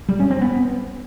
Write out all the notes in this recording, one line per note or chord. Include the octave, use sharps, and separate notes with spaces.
G3
C#4
C4
B3